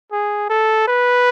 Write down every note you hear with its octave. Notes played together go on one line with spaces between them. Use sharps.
G#4
A4
B4